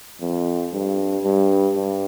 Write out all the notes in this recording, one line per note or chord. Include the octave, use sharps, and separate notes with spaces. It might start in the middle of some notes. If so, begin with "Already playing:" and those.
F2
G2
G2
G2